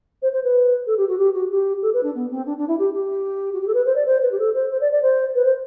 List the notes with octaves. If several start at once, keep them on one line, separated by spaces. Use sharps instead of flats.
C5
C5
B4
A4
G4
F#4
G4
F#4
G4
A4
B4
D4
B3
C4
D4
D4
E4
G4
G4
F#4
G4
A4
B4
C5
D5
C5
B4
G4
A4
C5
C5
D5
D5
C5
B4
C5